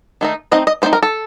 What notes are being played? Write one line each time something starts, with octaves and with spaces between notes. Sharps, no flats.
D#3 A3 D#4
A3 C4 D#4 D#5
D#5
A3 C4 D#4 C5
A#4
A4